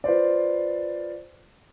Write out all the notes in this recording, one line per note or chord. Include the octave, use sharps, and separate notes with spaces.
F4 B4 C5 D5